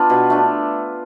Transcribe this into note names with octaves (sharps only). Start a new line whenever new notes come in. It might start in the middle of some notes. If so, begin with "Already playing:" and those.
Already playing: B3 D4 F4
B2
A3 D4